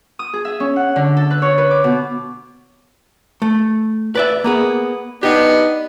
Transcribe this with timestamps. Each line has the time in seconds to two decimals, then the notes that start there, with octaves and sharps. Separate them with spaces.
0.19 D#6
0.33 G#4
0.45 E5
0.60 C#4
0.76 F#5
0.96 D3
1.17 A4
1.30 B4
1.42 C#5
1.58 B4
1.71 D6
1.84 B2
3.42 A3
4.15 B4 D5 E5
4.44 A#3 B3 G#4
5.23 B3 D4 D#4 G4